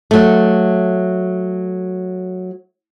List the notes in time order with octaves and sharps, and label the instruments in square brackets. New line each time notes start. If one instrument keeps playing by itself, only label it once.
[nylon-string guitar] F#3 A3